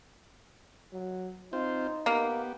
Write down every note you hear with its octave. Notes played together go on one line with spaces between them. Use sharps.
F#3
C4 D#4 F4 C5
A#3 B3 G4